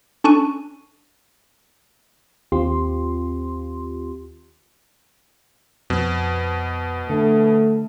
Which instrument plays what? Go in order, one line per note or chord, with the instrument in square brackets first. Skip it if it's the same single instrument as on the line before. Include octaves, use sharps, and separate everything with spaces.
[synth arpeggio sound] C#4 D4 A4 C#6 F#6 D#7
[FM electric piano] D#2 C4 F4 G4 C6
[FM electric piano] F2 [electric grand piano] B2
[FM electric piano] D3 [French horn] A3